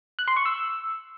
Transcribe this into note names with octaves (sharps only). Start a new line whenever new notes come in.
F#6
C6
C#6
E6